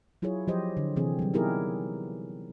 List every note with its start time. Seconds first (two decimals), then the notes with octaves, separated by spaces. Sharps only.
0.22 F#3 E4 F4 G#4 C#5
0.48 F3 F#3 G4 C5 D#5
0.77 D3
0.96 C3 E3 C4 G#4
1.19 F#3 G3
1.34 B3 D#4 E4 G4 G#4 A#4